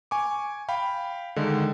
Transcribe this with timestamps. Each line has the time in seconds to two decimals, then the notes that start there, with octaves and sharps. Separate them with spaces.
0.11 G#5 C#6 D6
0.68 F5 G5 B5
1.36 D3 D#3 G#3